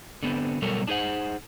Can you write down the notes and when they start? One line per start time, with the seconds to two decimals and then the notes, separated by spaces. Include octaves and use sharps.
0.23 D3 B3 C4
0.62 B2 F#3 G3 A4 A#4 C#5
0.87 D4 D#4 G#4 C5 F#5